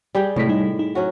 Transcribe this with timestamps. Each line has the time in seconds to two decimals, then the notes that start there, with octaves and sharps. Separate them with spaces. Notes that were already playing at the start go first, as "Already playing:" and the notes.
0.15 G3 G4 G#4
0.36 A2 C3 G#3 A3 B6
0.48 G3 D#4
0.79 D#4
0.95 F#3 C#4 F#4